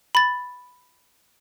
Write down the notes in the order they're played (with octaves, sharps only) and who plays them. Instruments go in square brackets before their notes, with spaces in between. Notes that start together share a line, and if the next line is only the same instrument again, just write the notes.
[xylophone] B5 A6